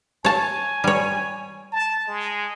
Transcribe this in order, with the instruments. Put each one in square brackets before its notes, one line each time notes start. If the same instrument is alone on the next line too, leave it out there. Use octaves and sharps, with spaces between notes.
[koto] C#5 A5 [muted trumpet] G#5
[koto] G3 C#5
[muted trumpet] A5
G#3